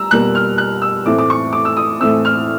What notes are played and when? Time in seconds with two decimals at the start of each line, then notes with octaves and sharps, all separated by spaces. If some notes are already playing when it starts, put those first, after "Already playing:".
Already playing: G3 A#5 E6
0.11 B2 G3 A#3 F#6
0.35 F6
0.58 F#6
0.82 E6
1.06 A2 E3 A3 C4 D6
1.18 D6
1.30 C#6
1.53 D6
1.65 E6
1.77 D#6
2.00 A2 E3 A3 C4 E6
2.25 F6